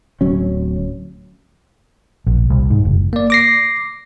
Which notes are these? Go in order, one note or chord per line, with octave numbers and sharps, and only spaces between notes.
D1 F#3 C#4
A#1
C2
G#2
F#1
A#3 D5
D6 A#6 C7